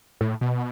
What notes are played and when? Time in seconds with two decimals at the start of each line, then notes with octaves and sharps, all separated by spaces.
0.21 A2
0.41 B2